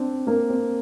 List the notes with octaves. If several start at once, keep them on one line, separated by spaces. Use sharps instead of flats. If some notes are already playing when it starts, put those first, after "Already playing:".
Already playing: C4 D4
A#3
C4